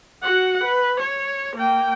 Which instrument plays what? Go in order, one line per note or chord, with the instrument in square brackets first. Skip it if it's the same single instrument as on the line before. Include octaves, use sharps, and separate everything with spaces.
[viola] F#4 F#5
B4
C#5
A#3 G5